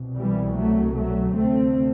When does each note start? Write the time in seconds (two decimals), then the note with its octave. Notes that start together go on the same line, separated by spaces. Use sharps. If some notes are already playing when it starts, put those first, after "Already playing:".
Already playing: C2 B2
0.16 E3 G3
0.56 F#3 A3
0.96 F#3 A3
1.36 D2 C3 A3 C4